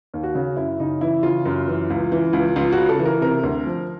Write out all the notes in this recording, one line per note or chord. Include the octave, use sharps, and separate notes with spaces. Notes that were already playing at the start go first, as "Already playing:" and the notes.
D#2
F#4
C#3
F#2 E4
C#3 D#4
E3 E4
C#3 F4
F#2
E3
C#2
E3
C#2
C#2 F4
F#4
C#3
A4
E3
A#4
C3 A#4
D2
F3